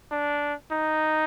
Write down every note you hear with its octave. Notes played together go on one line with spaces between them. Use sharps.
D4
D#4